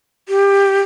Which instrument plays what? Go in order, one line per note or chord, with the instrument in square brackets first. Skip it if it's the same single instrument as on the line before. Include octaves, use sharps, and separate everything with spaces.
[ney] G4